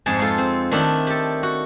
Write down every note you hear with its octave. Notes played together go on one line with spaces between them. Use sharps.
F2 G#2 G#3 G#4 A5
G#3 D#4 F4 A4
C4
D#3 A3 D4 E4
G4 A4
F#4